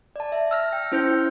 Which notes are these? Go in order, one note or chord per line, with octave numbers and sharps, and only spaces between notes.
D5 A5
E5
E6 F6 A#6
G5
C#4 E4 C5 F6 G6 C#7